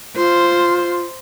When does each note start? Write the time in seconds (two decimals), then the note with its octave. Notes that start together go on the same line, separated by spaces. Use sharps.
0.16 F4 C5